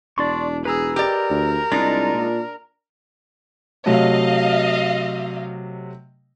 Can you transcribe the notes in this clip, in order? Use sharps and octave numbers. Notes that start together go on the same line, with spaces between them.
E1 D4 D5 C6 C#6
G#4 B4 A#5 E6
G4 A#4 D5
D2
C2 G#3 D4 D#4 F4
A#2
C3 F#3 A3 D#5 F5